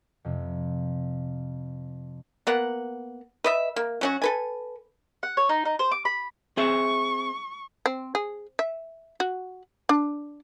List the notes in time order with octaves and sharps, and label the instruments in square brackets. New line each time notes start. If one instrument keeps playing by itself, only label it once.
[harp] F2 C3
[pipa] A#3 B3 F#5
B4 D#5 E5
A#3
F#3 C#4 F#4
A4 B4 G#5
[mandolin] F#5
C#5
D#4
D#4
C5
D6
B5
[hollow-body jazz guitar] C4 G#4 E5 [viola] C#6
[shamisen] C4
G#4
E5
F#4
D4